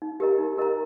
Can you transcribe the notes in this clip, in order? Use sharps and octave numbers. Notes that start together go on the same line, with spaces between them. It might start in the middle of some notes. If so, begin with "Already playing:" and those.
D#4
G4 A#4 D#5 A#5
D#4
G4 A#4 D#5 A#5